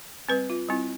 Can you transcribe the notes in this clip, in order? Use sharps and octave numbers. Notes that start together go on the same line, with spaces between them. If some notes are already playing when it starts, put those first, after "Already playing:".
G3 C4 B4
F4
G3 C4 E4